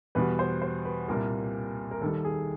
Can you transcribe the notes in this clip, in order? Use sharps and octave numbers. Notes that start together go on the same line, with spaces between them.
E2 B2 G3 B4
C5
C5
B4
C2 A#2 G3 A#3 A#4
A#4
D#2 D#3 G3 A4
G#4